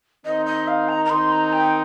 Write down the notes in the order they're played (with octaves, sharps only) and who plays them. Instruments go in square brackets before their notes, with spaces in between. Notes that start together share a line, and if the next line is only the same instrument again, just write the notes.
[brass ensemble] D#3 C4 D#4 [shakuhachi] D#5
[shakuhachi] D#5
F5
A#5
A#5
[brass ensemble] D#3 C4 D#4 [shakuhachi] C6
[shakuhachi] A#5
G5